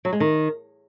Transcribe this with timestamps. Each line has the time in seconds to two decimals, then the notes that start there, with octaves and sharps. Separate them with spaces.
0.05 F#3
0.13 G#3
0.20 D#3